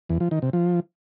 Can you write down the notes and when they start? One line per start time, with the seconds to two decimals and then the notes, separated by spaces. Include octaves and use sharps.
0.09 E2
0.20 F3
0.31 D#3
0.42 C3
0.53 F3